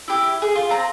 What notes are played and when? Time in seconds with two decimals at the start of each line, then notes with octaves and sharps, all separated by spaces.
0.08 E4 G4
0.42 G#4
0.55 F4
0.70 C4 A#5